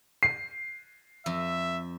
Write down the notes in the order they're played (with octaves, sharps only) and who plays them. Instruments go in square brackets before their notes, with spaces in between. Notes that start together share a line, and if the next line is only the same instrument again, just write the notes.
[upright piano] C7
[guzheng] F2 [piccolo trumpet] E5